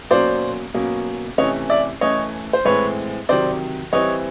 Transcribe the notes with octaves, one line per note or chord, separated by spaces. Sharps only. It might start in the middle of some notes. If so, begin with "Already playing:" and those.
B2 F#3 A#3 C#4 C5 D5
B2 F#3 A#3 C#4
C3 E3 A3 C#4 C#5 D#5
D5 E5
E3 A3 C#4 C#5 D#5
C5
A2 E3 G#3 C4 B4 C#5
C3 D#3 F#3 C5 D5
E3 G3 C4 C#5 D#5